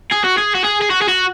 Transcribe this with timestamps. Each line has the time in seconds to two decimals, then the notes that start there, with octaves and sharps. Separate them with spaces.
0.11 G#4
0.24 F#4
0.37 G#4
0.55 F#4
0.64 G#4
0.82 G#4
0.90 F#4
1.02 G#4
1.08 F#4